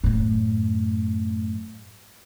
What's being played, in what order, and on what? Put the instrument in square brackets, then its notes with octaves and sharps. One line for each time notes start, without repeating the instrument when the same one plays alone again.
[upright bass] F#2 A2